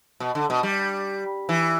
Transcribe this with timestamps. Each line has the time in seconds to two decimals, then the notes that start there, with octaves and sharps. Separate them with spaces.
0.20 B2
0.35 D3
0.50 B2
0.63 G3
1.49 E3